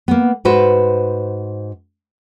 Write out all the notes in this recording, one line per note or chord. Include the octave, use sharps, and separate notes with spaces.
A#3 B3
G#2 F#4 B4 C5